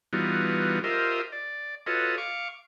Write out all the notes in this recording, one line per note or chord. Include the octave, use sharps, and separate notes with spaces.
E3 G3 B3 D#4 F4 F#4
F4 G4 A#4 C5 D#5 E5
D5
F4 F#4 A4 B4 C#5 D#5
F5 C#6 D6